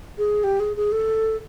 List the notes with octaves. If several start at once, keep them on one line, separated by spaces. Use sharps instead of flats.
G#4
G4
G#4
G#4
A4